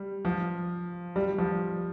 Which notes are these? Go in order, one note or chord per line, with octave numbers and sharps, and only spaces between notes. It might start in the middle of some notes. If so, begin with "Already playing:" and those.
Already playing: G3
F3
G3
F3